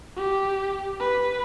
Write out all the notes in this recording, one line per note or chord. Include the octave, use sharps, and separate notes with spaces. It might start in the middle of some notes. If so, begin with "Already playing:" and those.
G4
B4